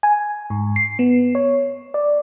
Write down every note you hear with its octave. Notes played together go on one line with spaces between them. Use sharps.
G#5
G#2
C7
B3
C#5
D5